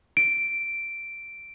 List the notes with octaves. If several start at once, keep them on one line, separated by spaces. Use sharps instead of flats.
D7